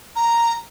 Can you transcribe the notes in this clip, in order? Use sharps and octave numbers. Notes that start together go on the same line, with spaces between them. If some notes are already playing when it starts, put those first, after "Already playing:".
A#5